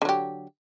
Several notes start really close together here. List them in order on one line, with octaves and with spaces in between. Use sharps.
D3 F#3 G4